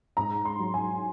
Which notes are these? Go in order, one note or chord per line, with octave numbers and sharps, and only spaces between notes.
G#2 A#5
C6
F#3
G#5